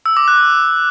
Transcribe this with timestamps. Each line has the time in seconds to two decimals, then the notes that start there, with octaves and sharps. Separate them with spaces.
0.06 E6
0.17 D6
0.28 F#6